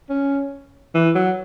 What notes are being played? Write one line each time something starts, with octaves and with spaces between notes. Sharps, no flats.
C#4
E3
F#3